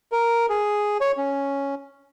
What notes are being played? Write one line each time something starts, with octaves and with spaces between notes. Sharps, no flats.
A#4
G#4
C#5
C#4